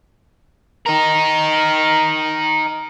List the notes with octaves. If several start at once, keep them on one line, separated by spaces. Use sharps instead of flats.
D#4 A#4